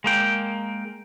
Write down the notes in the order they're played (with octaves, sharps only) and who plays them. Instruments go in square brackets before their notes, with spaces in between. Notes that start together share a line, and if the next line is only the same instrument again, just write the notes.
[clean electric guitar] G#3 A#3 G5